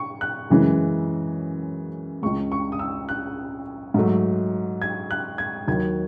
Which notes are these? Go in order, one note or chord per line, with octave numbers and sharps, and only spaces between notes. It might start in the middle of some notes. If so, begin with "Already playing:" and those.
Already playing: C#6
F#6
F#2 C#3 E3 G#3
C#2 C#3 G#3 C#6
C#6
D#6
E6
F#6
G#2 F#3 A3
G#6
F#6
G#6
D#2 D#3 F#3 G#6